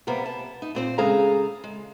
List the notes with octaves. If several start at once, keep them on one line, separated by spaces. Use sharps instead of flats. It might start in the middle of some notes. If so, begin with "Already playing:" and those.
C3 G3 A#3 B3
A5
D#4
A#2 C4 C5
C#3 G#3 G#4 A4 F5 A#5
G#3